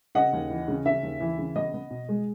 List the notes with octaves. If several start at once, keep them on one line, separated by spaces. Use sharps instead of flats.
C#3 D#5 F#5
D#2
E3
C#3
C#3 E5
D#2
E3
C#3
B3 D#5
B3
B2
G#3